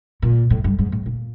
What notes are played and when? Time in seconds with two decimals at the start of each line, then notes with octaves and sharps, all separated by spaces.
0.22 A#2
0.50 A2
0.64 G2
0.79 G#2
0.92 A2
1.06 A#2